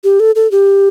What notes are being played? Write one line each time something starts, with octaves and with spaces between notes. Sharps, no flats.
G4
A4
A4
G4